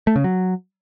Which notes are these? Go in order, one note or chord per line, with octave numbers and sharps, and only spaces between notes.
A3
C#3
F#3